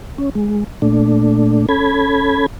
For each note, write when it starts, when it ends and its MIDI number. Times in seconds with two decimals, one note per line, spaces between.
0.18 0.30 61
0.35 0.64 56
0.82 1.66 46
0.82 1.66 57
0.82 1.66 62
1.69 2.46 61
1.69 2.46 69
1.69 2.46 83
1.69 2.46 92